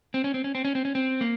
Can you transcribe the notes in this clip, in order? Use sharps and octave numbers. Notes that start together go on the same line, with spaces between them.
C4
C#4
C4
C#4
C4
C#4
C4
C#4
C4
A#3